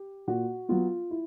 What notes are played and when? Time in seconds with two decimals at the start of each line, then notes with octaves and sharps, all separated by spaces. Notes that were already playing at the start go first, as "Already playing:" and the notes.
Already playing: G4
0.28 A#2 F#4
0.69 F#3 B3 F4
1.11 E4